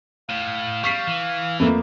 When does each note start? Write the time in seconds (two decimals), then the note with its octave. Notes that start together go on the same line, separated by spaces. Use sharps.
0.29 A2 F5
0.84 G3 C#6 B6 C7
1.07 E3
1.59 F2 A3 A#3 B4